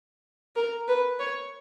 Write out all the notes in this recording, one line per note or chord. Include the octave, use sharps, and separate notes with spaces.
A#4
B4
C#5